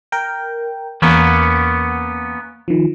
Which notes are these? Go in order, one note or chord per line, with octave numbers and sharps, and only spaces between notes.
A#4 G5
E2 A#3 B3 C#4 F#5 C#7
D#3 F3